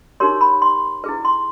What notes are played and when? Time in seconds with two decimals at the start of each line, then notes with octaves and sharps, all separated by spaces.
0.20 D#4 G4 A#4 C#5 C6
0.41 B5
0.62 C6
1.04 E4 G#4 B4
1.25 C6